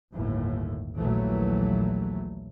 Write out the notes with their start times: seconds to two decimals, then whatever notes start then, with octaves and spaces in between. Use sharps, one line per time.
0.14 G1 D#2 A2
0.96 A#1 D#2 A#2 E3 F#3 A3